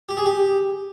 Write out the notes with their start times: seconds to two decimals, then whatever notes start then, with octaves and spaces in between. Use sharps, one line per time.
0.09 G4
0.17 G#4
0.25 G4